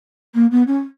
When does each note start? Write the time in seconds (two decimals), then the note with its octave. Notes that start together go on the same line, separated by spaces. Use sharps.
0.34 A#3
0.51 B3
0.67 C#4